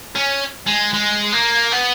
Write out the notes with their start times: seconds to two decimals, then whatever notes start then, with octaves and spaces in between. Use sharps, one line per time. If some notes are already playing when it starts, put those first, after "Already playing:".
0.15 C#4
0.67 G#3
0.94 G#3
1.33 A#3
1.72 B3